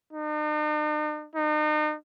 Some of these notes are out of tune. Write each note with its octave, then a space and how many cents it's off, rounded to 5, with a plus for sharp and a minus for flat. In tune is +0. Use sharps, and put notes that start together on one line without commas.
D#4 -45
D#4 -40